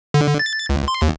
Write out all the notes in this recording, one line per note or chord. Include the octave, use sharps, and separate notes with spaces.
D3
A6
C#2
C6
D#2